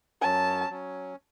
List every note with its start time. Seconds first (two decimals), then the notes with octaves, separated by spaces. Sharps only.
0.21 F#2 F#3 C#4 A5
0.70 F#3 C#4